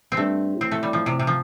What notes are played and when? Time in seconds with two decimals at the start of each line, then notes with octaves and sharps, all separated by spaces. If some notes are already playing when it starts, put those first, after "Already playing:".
0.12 C4
0.17 G2 A3
0.56 A2 C4
0.71 A3
0.83 G3
0.93 F3
1.06 C3
1.19 C3
1.27 F3